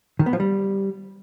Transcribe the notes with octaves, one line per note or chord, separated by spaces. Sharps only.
D#3
B3
F3
G3